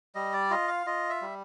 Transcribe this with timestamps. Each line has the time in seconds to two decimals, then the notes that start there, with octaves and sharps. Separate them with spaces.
0.15 G3 D#5
0.33 D5
0.51 F4 D#5
0.68 F5
0.87 F4 D#5
1.10 E5
1.22 G3